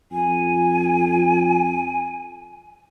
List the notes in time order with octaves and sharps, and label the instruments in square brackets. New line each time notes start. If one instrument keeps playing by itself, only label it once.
[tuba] F2 [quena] G#5